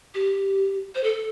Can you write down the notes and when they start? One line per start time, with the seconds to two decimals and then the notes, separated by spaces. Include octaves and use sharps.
0.15 G4
0.95 C5
1.04 A4